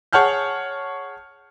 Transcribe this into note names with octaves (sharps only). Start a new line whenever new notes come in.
G#4 C#5 F#5 A5 F6 G6